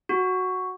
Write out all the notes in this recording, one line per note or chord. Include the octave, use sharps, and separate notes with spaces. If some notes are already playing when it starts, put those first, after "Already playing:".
F#4